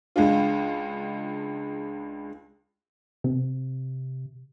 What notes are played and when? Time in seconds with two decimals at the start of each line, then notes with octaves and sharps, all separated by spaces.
0.16 C#2 G#3 D4 F4
3.24 C3